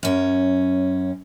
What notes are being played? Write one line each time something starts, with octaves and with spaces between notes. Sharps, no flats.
F#2 C#4